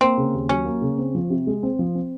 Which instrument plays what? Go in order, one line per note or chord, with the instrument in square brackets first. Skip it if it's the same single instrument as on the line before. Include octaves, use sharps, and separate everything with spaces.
[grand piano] A#3 [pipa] C4
[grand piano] C#3
D#2
[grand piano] F#3 [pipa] C#4
[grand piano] A#3
C#3
C4
F3
C3
G#3
C4
F3
C4